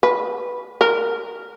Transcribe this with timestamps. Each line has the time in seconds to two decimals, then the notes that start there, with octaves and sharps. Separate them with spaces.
0.03 B4
0.81 A#4